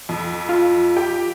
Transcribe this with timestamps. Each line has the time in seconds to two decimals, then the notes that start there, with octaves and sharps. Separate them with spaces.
0.09 F2
0.49 F4
0.96 G4 G5